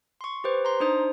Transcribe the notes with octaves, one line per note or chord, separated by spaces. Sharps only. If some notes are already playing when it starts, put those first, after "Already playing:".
C6 C#6
G4 B4 C5
A#5 C6
D4 D#4 C5 D#6